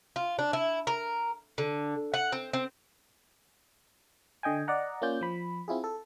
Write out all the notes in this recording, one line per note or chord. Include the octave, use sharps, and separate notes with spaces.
F4
D4
E4
A#4
D3
F#5
C4
C4
D3 D#5 G5 G#5
D5 D#5 F#5 A#5
A#3 C#4 F4 D5 G6
F3 B5
C4 E4 F4 G#4
A4